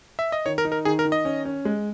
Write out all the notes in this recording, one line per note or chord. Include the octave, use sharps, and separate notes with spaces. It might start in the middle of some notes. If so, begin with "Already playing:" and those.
E5
D#5
D#3 C#5
A#4
D#4
A#4
D#3 G#4
A#4
D#3
D#5
C#4
C#4
G#3